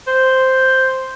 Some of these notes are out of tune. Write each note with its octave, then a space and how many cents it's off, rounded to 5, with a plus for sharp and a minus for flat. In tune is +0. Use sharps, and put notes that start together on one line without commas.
C5 +0